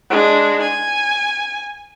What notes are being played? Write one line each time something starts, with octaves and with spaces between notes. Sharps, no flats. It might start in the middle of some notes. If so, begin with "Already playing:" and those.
G#3 D4
G#5